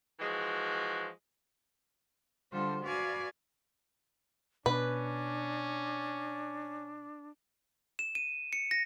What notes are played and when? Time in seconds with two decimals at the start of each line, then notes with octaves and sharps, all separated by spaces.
0.20 E3 F3 G#3 F#4
2.52 D3 G3 F4 A4 C5
2.84 F#4 B4 D5 F5 G#5
4.66 B2 C#4 D4 B4
7.99 E7
8.15 D#7
8.53 C#7
8.71 A#6